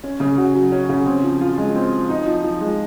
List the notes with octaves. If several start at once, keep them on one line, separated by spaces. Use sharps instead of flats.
C#4
C#3
F#4
F#3
C#4
C#3
C4
F3
F4
G#3
C4
F3
D#4
F3
F3
G#3